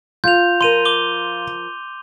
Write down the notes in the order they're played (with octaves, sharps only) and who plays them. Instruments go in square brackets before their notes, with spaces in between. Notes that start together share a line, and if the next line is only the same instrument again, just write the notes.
[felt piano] F4 [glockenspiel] G6 F7
[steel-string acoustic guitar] F3 A#4 [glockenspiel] C6 D#7 F7
[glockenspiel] D6 G7